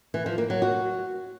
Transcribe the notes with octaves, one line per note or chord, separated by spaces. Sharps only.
E3
F3
A#3
F#3
F#4